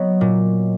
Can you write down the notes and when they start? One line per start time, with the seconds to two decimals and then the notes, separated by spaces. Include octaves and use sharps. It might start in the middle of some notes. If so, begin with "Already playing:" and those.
Already playing: F#3 B3 C#5 D#5
0.21 A#2